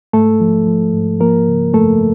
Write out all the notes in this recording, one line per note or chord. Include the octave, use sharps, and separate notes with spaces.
G#2 A3 A4
F3
F3
G#2
F3 A#3 A#4
C#3
F#2 A3 A4